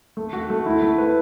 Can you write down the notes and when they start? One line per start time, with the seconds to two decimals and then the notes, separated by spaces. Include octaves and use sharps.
0.17 A3
0.33 F#4
0.50 A3
0.66 E4
0.82 A3
0.98 B4